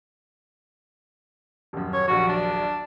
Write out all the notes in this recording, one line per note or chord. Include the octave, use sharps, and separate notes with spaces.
D#1 F#2
C#5
A#1 D#2 F#3 F#4
D4